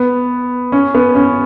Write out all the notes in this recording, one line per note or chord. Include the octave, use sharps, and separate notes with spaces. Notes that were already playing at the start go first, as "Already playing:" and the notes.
Already playing: B3
C#4
B3
C#4